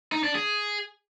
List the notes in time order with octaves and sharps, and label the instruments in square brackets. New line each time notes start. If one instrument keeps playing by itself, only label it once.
[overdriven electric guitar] D#4
D4
G#4